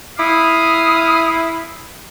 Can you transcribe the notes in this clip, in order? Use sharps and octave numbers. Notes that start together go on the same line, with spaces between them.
E4 F5 D#6